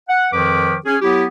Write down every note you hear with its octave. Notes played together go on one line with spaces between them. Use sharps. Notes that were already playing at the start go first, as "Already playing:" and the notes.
F#5
F2 D#3 F3 B4 D6
C#4 G#4
F#3 B3 E4 G4